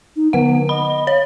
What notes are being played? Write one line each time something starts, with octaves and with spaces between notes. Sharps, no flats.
D#4
D3 B3 F#5
D#5 B5
C#5